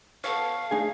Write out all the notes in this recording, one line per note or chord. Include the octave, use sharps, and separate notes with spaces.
B2 A4 C#5 F5 F6
A3 D4 D#4 G#4 G#5